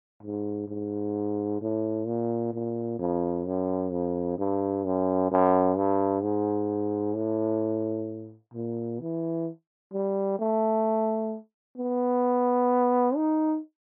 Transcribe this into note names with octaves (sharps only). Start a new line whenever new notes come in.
G#2
G#2
A2
A#2
A#2
F2
F#2
F2
G2
F#2
F#2
G2
G#2
A2
A#2
E3
G3
A3
B3
D#4